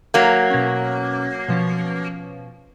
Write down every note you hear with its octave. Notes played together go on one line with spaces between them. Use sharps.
F#3 A#3
B2 C#4
B2 F3 C#4